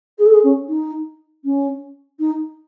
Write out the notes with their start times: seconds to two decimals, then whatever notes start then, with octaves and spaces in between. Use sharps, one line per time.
0.18 G#4
0.25 A4
0.33 G#4
0.43 C#4
0.68 D#4
1.44 C#4
2.19 D#4